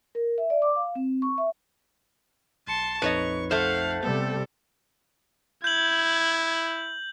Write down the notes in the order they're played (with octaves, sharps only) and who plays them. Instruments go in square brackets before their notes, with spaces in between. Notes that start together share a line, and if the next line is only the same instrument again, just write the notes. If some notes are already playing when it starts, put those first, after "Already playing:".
[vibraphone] A#4
E5
D5
D6
F5
C4
C#6
E5
[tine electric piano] B1 C#7 [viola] A5 C6
[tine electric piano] A#1 F2 D#4 [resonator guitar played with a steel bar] B4 C#5 D#5 [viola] C#6
[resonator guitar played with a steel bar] A3 C5 [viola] F5 F#5
[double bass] C3 G3 [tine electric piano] B3 [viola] A4
[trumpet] E4 [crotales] G6 F#7 [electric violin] G#6